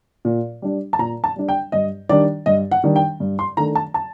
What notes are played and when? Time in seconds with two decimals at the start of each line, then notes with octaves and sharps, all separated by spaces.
0.25 A#2
0.62 G3 D4
0.93 A5
0.99 A#2 A#5
1.24 A5
1.36 G3 D4
1.49 G5
1.72 G2 D#5
2.09 D#3 G3 D4 D5
2.46 G2 D#5
2.71 F#5
2.84 D#3 G3 D4
2.96 G5
3.20 G2
3.39 C6
3.57 D#3 A3 D4 A#5
3.75 A5
3.94 A5